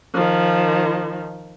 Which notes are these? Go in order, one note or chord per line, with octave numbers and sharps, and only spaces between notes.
D#3 F3